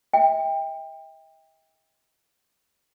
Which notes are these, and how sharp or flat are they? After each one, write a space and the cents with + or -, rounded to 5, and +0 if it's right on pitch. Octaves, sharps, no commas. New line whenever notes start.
E5 -45 G5 +25